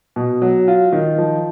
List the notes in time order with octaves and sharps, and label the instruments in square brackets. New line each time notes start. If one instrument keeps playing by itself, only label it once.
[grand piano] B2
F#3
F4
D#3
F3